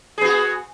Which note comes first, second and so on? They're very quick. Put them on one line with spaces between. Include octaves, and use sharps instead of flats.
G#4 B3 F#4